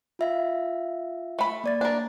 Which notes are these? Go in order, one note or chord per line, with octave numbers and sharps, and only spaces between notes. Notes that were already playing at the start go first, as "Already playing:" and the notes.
F4 E5 F5
A3 B5
A#3 D5 A6
D4 A#4